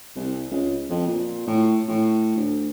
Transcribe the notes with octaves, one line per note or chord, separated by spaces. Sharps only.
C2
C#2
F2
A#2
A2
A2
D2